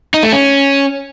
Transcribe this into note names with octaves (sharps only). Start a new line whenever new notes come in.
D#4
A3
C#4